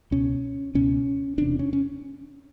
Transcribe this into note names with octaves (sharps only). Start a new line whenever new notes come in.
C#2 B2 C#4
C#2 B2 C#4
E1 E2 C3 D4
C#4
C#4